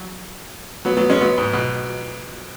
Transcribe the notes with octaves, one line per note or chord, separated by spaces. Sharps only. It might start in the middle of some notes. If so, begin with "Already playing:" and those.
Already playing: F#3
F#3 B3
F#3 B3
G#3 C#4
F#3 B3
G#2
B2